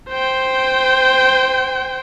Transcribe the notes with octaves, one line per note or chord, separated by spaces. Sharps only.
C5 G5